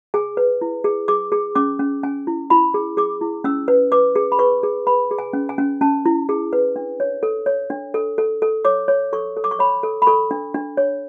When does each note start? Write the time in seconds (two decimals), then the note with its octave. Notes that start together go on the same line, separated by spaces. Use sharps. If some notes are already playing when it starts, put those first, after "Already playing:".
0.14 G#4 G#5
0.37 B4
0.61 E4
0.84 G#4
1.08 G#4 D6
1.32 G#4
1.56 C#4 D6
1.79 C#4
2.03 C#4 G#5
2.27 E4
2.50 E4 B5
2.74 G#4
2.97 G#4 D6
3.21 E4
3.44 C#4 E6
3.68 B4
3.92 B4 D6
4.16 G#4
4.32 B5
4.39 B4 C#6
4.63 G#4
4.87 B4 B5
5.11 G#4
5.19 G#5
5.33 C#4
5.49 G#5
5.58 C#4
5.81 C#4 A5
6.06 E4
6.29 G#4
6.53 B4
6.76 D4
7.00 C#5
7.23 A4
7.46 C#5
7.70 D4
7.94 A4
8.18 A4
8.42 A4
8.65 C#5 D6
8.88 C#5
9.13 A4 C#6
9.37 A4
9.44 D6
9.51 C#6
9.59 C#5 B5
9.83 A4
10.02 B5
10.07 A4 C#6
10.31 D4
10.54 D4
10.77 C#5